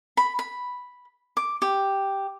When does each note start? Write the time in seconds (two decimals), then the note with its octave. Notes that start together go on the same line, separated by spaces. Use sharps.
0.17 B5
0.39 B5
1.37 D6
1.62 G4